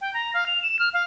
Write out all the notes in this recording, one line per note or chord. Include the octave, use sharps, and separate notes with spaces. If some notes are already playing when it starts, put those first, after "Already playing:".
G5
A#5
F5
F7
E7
F6
F5